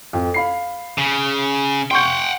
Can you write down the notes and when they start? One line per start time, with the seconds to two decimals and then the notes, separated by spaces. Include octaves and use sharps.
0.13 F2
0.34 F5 B5 C7
0.98 C#3
1.91 F#5 G5 C6 C#6 G6